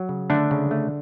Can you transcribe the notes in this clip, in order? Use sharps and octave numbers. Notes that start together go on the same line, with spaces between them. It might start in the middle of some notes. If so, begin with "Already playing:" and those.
Already playing: F#3
C#3
D3 A3 D4
C#3
A3